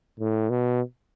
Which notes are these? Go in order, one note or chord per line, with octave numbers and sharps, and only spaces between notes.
A2
B2